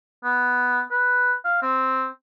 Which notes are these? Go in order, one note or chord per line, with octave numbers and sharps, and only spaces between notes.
B3
B4
F5
C4